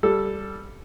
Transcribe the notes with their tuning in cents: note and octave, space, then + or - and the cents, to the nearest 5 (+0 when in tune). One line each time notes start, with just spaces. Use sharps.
G3 +0 A4 +0